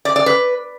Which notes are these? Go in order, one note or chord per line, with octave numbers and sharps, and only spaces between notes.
D5
D5
B4